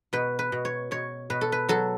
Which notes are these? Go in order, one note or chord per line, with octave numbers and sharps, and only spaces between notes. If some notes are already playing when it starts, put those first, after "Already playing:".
B2 B4
B4
B2
C#5
B2 C#5
B2 B4
A4
B4
F#3 A4